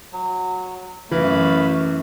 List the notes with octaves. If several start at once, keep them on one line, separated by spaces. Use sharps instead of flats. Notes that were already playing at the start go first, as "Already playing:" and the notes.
F#3
F#2 E3 A3 F5 B5